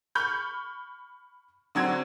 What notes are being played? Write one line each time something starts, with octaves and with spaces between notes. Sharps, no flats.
B5 C#6 F6 G6
D3 F#3 C4 G#6